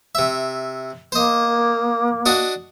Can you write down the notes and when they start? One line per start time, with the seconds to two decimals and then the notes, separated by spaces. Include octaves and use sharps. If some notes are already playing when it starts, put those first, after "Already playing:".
0.15 C3 E5
1.12 A#3 C5 D#5
2.26 D4 F#4 D#5